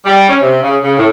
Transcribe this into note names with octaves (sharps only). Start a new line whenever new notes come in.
G3
C#4
C3
C#3
C#3
A2